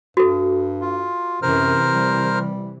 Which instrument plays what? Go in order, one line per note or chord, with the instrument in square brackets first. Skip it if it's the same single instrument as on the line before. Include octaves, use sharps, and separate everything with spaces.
[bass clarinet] G2 [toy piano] F#4 A4
[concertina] F4
[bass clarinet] F#2 [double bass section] C3 E3 [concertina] A#4 C5 F6
[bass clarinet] G3